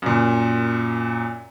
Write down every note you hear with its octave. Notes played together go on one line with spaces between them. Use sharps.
F#2 A#2